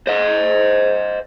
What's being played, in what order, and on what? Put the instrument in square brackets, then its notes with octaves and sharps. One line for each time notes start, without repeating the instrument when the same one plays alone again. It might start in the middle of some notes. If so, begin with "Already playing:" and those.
[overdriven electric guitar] C5 D#5